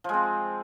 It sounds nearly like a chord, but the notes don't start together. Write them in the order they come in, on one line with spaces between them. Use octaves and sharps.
F3 G#3 C4